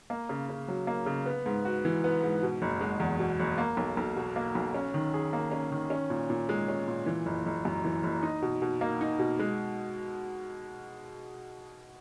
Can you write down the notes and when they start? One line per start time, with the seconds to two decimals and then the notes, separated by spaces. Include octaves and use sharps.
0.10 A#3
0.29 C#3
0.49 C#3
0.68 F#3
0.87 A#3
1.06 C#3
1.26 B3
1.46 G#2
1.65 F#4
1.85 E3
2.04 B3
2.23 G#2
2.43 B2
2.62 F#1
2.81 G#3
3.00 E2
3.19 B2
3.40 F#1
3.58 A#3
3.77 B1
3.97 B1
4.16 B2
4.36 A#3
4.55 B1
4.74 C#4
4.94 D#3
5.14 G#4
5.33 A#3
5.52 C#4
5.72 D#3
5.90 C#4
6.10 A#2
6.30 A#2
6.49 G#3
6.68 C#4
6.88 A#2
7.06 E3
7.26 F#1
7.46 F#1
7.65 F#2
7.85 E3
8.03 F#1
8.23 D#4
8.42 B2
8.62 B2
8.81 A#3
9.01 D#4
9.19 B2
9.39 G#3